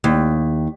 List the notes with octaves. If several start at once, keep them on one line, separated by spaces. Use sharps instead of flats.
D#2